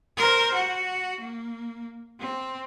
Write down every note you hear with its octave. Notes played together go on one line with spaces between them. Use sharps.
A#4 C5
F#4
A#3
C4